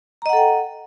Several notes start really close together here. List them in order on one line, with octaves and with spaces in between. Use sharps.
A#5 D#5 F#5 A4 G5